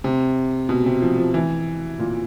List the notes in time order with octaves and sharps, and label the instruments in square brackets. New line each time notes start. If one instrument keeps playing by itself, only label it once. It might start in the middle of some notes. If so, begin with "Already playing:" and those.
[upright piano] C3
B2
C3
F3
F3
E3
A#2